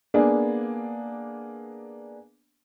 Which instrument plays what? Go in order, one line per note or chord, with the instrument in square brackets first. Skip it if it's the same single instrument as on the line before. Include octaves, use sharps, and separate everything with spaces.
[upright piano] A#3 B3 D4 G#4